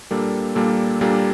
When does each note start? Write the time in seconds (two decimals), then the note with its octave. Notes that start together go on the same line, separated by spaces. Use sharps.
0.11 A#2 G3 A#3 D4 A4
0.55 A#2 G3 A#3 D4 A4
1.01 A#2 G3 A#3 D4 A4